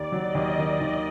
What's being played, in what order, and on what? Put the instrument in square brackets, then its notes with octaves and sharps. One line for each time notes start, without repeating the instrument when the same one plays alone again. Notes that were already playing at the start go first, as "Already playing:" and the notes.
Already playing: [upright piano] D#2 [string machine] D5
[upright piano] F#3
[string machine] D#5
[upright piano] D#2
[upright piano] D#3 [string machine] D#5
[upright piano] D#2